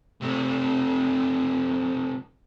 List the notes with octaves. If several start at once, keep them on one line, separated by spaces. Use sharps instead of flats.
C3 A3